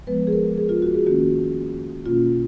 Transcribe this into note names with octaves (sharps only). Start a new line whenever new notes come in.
F3 G#3 B3 B4
G#4
A#4
G#4
F4
F#4
G#4
D#3 A#3 C#4 F#4
B2 A#3 C#4 F4